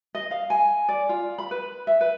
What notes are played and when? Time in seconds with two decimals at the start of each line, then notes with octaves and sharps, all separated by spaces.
0.15 D#5
0.31 F5
0.50 G#5
0.89 D5
1.09 F4
1.38 B5
1.51 B4
1.87 E5
2.01 B4